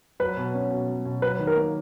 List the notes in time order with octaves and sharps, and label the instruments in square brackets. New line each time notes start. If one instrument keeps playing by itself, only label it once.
[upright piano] F#3 [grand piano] B4
[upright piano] B2
C#4
B2
F#3
B2
[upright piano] F#3 [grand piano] B4
[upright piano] D#3
[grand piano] A#4
[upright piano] A#3